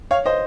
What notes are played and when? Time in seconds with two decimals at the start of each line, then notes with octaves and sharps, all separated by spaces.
0.11 C#5 F5
0.26 C5 D#5